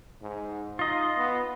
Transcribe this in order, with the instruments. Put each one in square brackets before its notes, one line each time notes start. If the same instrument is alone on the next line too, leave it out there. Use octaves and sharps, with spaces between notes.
[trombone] G#2
[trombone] D#4 [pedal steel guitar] F4 D#5
[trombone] B3